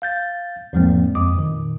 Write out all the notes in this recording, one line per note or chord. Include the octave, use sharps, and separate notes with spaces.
F5 G6 A6
E2 G#2 F3 G#3 A#3 C4
F2 D6 D#6
A#2 D#3